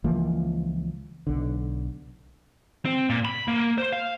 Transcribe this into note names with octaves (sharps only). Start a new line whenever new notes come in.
C#2 E3 F3 A#3
B1 D3
C4
A#2
B5
A#3
C5
F5